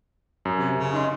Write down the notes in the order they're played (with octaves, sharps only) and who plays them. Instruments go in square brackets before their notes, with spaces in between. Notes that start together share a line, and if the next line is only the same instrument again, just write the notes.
[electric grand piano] F#2
[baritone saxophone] C3
C#3
[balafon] D#4 D#5 C6